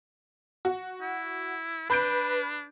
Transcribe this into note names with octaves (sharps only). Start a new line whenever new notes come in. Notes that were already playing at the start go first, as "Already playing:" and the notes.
F#4
E4
D4 B4 B5 G6 D7